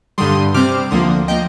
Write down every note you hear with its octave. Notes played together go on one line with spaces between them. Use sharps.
G2 D3 G3 C6 D#6
C3 G3 C4 D6 F6
D2 D3 F3 A#3 C6 D#6
F3 A#3 D#5 G5